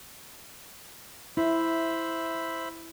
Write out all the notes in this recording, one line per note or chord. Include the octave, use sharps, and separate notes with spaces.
E4 C5 E5 B5